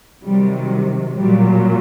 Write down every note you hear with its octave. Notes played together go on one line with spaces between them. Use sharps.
C3 D#3 F#3 G3
A#2 F#3 G3